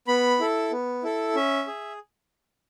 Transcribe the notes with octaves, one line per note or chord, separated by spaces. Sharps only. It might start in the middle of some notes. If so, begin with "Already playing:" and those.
B3 B5
E4 A4
B3
E4 A4
C#4 E5
G#4